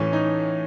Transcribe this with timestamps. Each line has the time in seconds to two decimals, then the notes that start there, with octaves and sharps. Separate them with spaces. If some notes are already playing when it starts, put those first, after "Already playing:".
Already playing: A2 E3 C#4
0.13 D#4